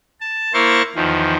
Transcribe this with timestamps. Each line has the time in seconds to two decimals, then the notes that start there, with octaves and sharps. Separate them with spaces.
0.20 A5
0.54 A#3 E4 A#4 C5 C#6 A6
0.95 E2 D#3 F3